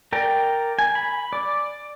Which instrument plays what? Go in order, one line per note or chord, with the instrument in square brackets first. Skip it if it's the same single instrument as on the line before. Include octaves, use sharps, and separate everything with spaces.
[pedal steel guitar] A#4 D5 G5 A#5
G#5
B5
D5